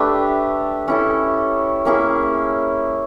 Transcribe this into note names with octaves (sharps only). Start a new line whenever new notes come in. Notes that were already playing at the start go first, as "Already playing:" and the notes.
Already playing: A3 D4 G4 B4
C#4 E4 A4
A#3 C#4 E4 G#4